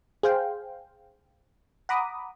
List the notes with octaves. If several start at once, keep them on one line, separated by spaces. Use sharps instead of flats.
G#4 C5 F5 G5
F#5 A#5 B5 D6 D#6